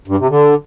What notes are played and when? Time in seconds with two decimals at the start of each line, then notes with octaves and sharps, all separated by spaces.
0.08 G2
0.18 C3
0.29 D3